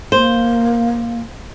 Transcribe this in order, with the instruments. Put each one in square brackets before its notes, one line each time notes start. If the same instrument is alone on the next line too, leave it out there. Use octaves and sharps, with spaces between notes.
[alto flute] A#3 [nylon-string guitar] C5